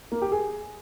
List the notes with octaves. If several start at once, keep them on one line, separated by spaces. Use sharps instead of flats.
A#3
G4
G#4